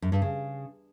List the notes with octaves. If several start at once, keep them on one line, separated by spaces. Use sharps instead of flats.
F#2
G2
C#3